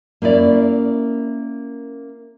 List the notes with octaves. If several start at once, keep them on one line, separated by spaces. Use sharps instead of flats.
A#3 C#4 E4 D5